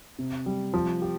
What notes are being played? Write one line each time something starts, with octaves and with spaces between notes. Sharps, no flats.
C3
G3
F3
G4